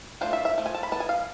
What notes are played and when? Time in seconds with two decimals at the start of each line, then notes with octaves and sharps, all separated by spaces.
0.21 F3 A3 D4 F4 C5
0.33 E5
0.45 E5
0.58 F3 A3
0.66 G#5
0.75 A5
0.83 B5
0.92 E3 B3 A5
1.00 G#5
1.09 F5